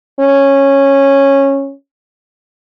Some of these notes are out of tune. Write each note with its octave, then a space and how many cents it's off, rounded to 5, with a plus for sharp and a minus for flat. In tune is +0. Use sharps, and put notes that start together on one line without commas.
C#4 -10